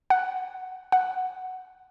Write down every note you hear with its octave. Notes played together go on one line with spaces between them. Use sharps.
F#5
F#5